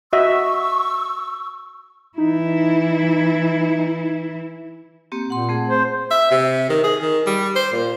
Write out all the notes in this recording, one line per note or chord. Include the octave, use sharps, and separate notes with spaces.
F#4 D#5 E5 C#6 E6
E3 D#4 E4
A#3 C4 G4
A#2 F#5 C6
A3 C4 G#4
C5
E5
C3
D#3
G#4
D#3
G3
C5
A#2